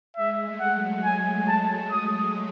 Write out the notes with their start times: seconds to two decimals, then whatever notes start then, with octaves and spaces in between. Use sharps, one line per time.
0.16 G#3 E5
0.46 A3
0.60 F#5
0.75 F#3
1.04 G#5
1.48 A5
1.91 D#6